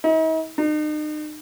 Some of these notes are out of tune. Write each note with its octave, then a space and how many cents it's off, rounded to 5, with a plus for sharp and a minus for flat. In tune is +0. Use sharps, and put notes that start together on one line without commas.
D#4 +45
D#4 -40